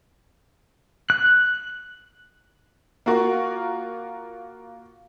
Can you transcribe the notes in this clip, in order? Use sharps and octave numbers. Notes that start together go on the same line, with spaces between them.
F#6
A#3 F4 F#4 A#4